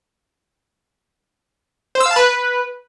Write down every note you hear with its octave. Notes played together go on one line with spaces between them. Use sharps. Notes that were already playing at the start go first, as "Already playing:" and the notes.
C5
E6
F5
A5
B4